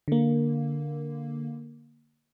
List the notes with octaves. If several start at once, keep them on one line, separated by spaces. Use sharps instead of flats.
D3 A#3